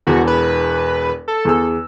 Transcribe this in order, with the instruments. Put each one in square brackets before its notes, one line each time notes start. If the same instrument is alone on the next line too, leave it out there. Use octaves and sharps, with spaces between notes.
[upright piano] E1 E2 [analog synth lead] F#4
[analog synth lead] B4
A4
[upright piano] E2 G#4 E6